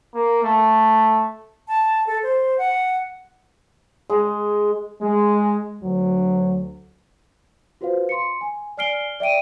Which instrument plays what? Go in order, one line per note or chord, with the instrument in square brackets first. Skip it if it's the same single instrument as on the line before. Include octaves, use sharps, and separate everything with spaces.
[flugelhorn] A#3
A3
[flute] A5
A4
C5
F#5
[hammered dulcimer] G#3
[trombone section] G#3
D2 F#3
[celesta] F4 F#4 B4 C5 F5
C6 C#7
G#5
D5 G#5 F6 C7 D7 G7
D5 E5 G5 D7 D#7